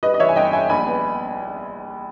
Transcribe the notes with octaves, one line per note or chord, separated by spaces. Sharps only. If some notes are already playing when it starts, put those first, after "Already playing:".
G3 B4 D#5
D#5
E3 C#5 E5
G#5
G1 D#5 G5
G1 E5 G#5
A#1 G#5 B5
B3